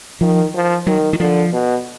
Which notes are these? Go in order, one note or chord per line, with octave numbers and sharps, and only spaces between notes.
D#3 F3
F3
D#3 F#3
D#3
D3 F3
B2